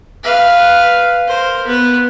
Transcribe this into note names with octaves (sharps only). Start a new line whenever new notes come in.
B4 F5
A#4 C5
B3 B4